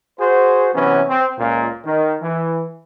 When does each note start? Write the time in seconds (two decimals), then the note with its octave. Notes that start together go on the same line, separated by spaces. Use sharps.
0.20 F#4 G#4 C5
0.74 C3 E3 F#3 B3 C#4
1.08 C4
1.39 C#2 A#2
1.85 D#3
2.22 E3